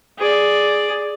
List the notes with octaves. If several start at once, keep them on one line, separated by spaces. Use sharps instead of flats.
G#4 D5